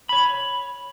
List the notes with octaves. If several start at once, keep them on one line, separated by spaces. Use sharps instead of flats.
C#5 B5